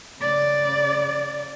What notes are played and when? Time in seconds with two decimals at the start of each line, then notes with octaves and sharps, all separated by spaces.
0.20 C#3 D5